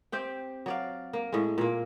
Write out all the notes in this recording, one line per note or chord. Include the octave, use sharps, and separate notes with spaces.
C4 G4 G5
F#3 D5 F5
A#3
A2 G#3
A#2 A#3